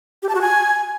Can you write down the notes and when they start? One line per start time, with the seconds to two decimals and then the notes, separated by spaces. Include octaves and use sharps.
0.23 G4
0.29 A5
0.35 F#4
0.41 G#5